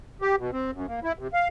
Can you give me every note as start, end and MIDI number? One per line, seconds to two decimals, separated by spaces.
0.22 0.36 67
0.38 0.51 47
0.53 0.71 60
0.73 0.86 42
0.88 1.00 58
1.03 1.13 64
1.19 1.28 48
1.33 1.48 77